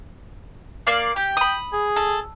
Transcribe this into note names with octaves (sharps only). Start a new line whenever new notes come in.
A#3 D5 F5
G4 G5
B5 D#6
G#4
A4